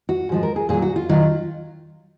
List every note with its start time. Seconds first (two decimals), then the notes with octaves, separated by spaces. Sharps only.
0.09 F#4
0.29 G#2 F3 G#3
0.43 A#4
0.56 G#4
0.69 A#2 F#3 G#4
0.82 F#4
0.96 F4
1.09 D#3 F#3 F4